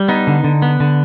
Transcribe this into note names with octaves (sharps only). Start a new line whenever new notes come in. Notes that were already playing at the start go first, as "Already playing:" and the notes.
Already playing: G3
B3 D#4
D3
D3
B3
D3